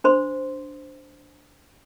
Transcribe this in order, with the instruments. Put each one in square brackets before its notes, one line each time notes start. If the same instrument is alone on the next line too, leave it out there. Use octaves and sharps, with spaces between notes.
[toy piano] D4 C5 C6